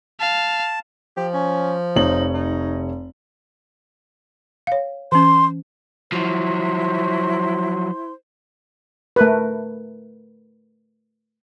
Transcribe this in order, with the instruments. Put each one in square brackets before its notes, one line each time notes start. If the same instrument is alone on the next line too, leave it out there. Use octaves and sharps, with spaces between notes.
[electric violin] F5 [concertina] A5
[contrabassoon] F3 [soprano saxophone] G4
[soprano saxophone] C#4
[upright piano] F1 C#5 F#7 [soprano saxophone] D#4
[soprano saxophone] D#4
[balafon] C#5 F5
[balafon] E3 C#4 [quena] C6
[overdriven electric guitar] F3 F#3 [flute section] E4 C5 C6
[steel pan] A3 A#4 B4